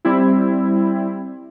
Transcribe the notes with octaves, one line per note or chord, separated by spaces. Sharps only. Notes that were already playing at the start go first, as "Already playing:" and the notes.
G3 C4 E4